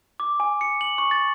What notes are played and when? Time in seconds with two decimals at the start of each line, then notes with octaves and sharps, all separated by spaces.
0.20 D6
0.40 G#5
0.61 C#7
0.81 F#7
0.98 C#6
1.11 A6